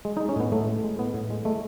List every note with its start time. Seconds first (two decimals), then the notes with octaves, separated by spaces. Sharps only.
0.05 G#3
0.17 G#3 D#4
0.29 C#4
0.36 A2 B3
0.52 A2 A3
0.68 G#3
0.84 G#3
0.98 A2 B3
1.14 A2
1.30 G#3
1.45 G#3 A3